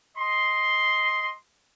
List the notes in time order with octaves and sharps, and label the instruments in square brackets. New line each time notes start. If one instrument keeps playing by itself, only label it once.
[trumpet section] D#5 C6